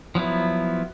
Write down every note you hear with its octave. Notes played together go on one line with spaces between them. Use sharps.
F3 F#3 B3 E4